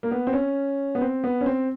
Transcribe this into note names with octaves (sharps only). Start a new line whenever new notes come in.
A#3
B3
C4
C#4
B3
C4
B3
C#4
C4